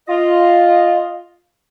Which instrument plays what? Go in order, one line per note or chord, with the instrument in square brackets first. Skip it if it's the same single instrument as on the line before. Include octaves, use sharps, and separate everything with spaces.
[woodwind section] F4 D#5